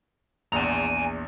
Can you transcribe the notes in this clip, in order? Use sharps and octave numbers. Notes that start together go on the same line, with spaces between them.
A#1 E2 G#5 A#5